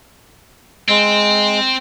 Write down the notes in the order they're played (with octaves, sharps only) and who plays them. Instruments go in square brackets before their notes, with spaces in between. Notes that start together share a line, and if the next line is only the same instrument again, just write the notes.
[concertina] G#3 [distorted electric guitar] C4